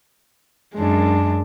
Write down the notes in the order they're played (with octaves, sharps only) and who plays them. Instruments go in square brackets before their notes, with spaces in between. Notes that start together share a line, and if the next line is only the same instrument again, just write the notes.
[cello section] F#2 [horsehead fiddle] G#3 D4